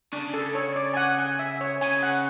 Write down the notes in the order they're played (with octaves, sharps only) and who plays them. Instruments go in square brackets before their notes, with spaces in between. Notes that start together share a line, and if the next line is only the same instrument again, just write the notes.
[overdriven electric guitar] C#3 [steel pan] D4
[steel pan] A4
C#5
D5
G#5
F#5
G#5
E5
C#5
[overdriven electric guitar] C#3 [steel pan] G#5
[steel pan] F#5